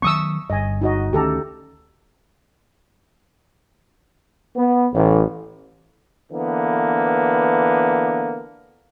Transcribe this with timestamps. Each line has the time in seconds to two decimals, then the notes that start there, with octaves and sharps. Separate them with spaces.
0.02 D#3 F#3 B3 C#6 D#6 E6
0.50 G1 G2 D#5 G#5
0.81 D#4 F#4 D#5
1.13 D2 D#3 C#4 G4 A4 A#5
4.56 B3
4.93 A1
6.31 D3 E3 A#3 B3